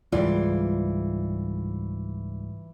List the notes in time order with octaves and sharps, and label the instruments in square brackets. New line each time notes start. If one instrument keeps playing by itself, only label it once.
[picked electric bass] C#2 G#2 G3 [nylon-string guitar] E3 F4 D5